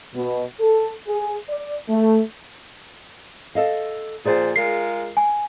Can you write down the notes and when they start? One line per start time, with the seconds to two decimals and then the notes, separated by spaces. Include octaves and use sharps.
0.15 B2
0.60 A4
1.08 G#4
1.49 D5
1.89 A3
3.55 A4 D#5 F5
4.25 A#2 F3 G#4 C5 D5 G#5
4.56 G#3 F4 A#4 C7
5.17 G#5